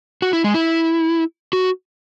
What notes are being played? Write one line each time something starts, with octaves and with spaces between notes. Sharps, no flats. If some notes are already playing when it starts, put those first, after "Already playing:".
F#4
E4
G#3
E4
F#4